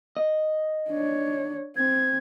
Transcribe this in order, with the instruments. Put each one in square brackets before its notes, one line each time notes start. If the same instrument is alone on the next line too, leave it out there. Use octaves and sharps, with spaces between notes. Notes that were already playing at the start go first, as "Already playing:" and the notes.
[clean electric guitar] D#5
[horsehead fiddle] D4 C#5
[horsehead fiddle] C4 [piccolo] G#6